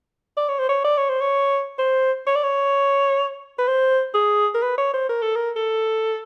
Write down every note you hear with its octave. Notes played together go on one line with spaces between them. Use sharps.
D5
C#5
C5
C#5
D5
C#5
C5
C#5
C5
C#5
D5
C#5
B4
C5
G#4
A#4
B4
C#5
C5
A#4
A4
A#4
A4